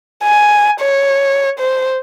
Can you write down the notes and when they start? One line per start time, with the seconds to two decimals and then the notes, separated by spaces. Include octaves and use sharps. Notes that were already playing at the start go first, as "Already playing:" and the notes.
0.24 G#5
0.81 C#5
1.59 C5